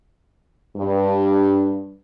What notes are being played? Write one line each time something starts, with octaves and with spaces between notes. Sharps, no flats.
G2